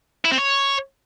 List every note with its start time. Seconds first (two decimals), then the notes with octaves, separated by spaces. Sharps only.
0.25 E4
0.32 C4
0.38 C#5